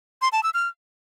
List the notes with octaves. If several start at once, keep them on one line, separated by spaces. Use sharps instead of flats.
C6
A5
E6
F6